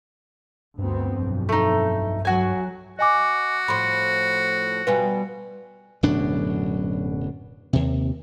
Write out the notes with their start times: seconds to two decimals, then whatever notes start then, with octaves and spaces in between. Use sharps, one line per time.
0.78 D2 G2 B3 C4
1.18 B1 F2
1.49 A3 D#4
2.25 F#3 F#4 G#5
2.99 F#4 D#5 G#5 D6
3.68 A2 F3 B5 C6
4.87 B2 G3 F4 B4 G#5
6.03 D1 F#2 B2 D4
7.73 D#2 C3